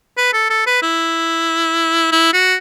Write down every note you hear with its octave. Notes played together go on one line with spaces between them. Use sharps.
B4
A4
A4
B4
E4
E4
F#4